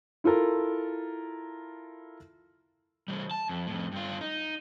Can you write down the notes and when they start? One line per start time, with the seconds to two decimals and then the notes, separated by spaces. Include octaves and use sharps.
0.24 E4 F4 A4 A#4
3.08 E3 G3
3.31 A5
3.49 F2
3.67 F2 A2
3.92 G2 F4
4.21 D#4